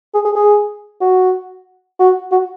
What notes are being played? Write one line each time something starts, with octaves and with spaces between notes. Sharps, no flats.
G#4
G#4
G#4
F#4
F#4
F#4